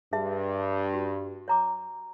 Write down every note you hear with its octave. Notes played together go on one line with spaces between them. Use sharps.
G2 G#4 E5 A5
F#4
C#5 A#5 D6